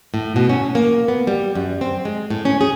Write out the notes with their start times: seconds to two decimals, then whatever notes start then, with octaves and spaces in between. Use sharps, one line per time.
0.14 A2
0.36 B2
0.49 C#4
0.75 A#3
1.08 B3
1.27 G3
1.55 F#2
1.81 C4
2.05 G#3
2.30 A2
2.45 C#4
2.61 G#4